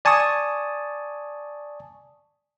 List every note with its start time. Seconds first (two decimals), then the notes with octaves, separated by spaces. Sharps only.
0.05 D5 G#5 A5 C#6 D#6